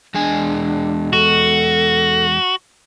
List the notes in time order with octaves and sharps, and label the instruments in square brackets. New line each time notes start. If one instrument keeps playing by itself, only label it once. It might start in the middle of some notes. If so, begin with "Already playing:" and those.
[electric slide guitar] E2 G#3 G#5 [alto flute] D4
[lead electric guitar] F#4 [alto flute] A4